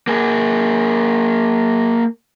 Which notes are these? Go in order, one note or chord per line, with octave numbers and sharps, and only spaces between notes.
A#3 G#4